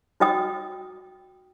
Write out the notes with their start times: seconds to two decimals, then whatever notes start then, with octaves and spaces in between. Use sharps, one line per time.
0.20 D#4 F#4 D#5 G5 D#6